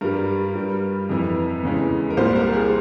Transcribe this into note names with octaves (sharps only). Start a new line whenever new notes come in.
G2 G3 A#4
G2 G3
F2 C3 E3
E2 C#3 E3 G#3
A#4
C2 A#2 G3 C5
A#4
G#4